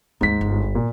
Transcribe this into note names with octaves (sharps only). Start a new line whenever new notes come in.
D#2 G#2 G#3 B6
G1
A#2